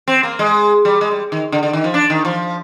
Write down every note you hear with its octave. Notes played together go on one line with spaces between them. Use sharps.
C4
A#3
G#3
G3
G#3
G3
D#3
D3
D3
D#3
F3
D4
D#3
F3